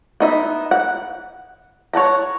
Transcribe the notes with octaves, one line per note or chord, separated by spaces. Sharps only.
B3 D#4 E5
F#5
C#5 F#5 A5 A#5